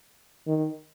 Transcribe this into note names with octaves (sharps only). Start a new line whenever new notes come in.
D#3